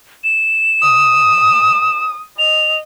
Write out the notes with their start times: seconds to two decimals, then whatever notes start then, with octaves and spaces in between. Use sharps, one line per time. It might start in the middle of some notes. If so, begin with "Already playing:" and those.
0.24 E7
0.82 D#6
2.39 D#5 F7